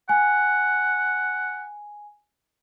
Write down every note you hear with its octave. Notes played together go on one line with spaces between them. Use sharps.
F#5 G#5